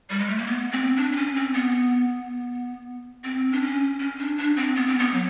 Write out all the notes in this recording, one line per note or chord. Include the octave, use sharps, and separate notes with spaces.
G3
G#3
A3
A#3
B3
C4
D4
D4
C#4
C4
B3
C4
D4
C#4
C#4
D4
D4
C4
B3
C4
B3
F#3